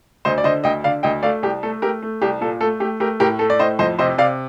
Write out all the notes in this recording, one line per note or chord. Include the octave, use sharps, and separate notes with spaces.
D2 C5 D#5
D5
D3 C5 D#5
D2 D#5 G5
D3 D5 F5
D2 D#5 G5
A3 D5 F5
C2 G4
A3 A4
A3 G4 A#4
A3
C2 G4
A#2 A4
A3 A4
A3 G4
A3 G4 A#4
A2 G4 A#4
A3 A4
D5
A2 C5 D#5
F2 C5 D#5
C3 C5 D#5
C3 D5 F5